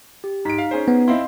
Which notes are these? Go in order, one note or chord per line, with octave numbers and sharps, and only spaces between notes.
G4
G#2 D#4 B6 D7
F5
C#4 G#4 C5
B3
C4 E4 D#5 F5 C6